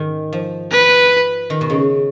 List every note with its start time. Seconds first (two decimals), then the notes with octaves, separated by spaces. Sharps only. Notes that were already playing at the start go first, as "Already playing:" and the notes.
Already playing: G#2 D#3
0.33 F3
0.72 B4
1.50 D#3
1.61 B2
1.70 C#3